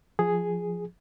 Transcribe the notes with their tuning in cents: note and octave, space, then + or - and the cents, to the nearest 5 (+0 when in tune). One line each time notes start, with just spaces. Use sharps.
F3 +0 G#4 +0